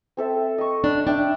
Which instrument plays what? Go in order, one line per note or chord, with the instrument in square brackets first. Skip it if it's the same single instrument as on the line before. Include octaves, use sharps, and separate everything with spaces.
[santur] C4 A4 E5
D#5 C#6
[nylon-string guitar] D4 [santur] B5
[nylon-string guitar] D4 [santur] E5 G5